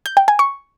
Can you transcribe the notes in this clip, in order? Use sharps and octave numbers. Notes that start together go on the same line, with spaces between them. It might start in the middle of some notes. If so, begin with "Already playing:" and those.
G6
G5
G#5
C#6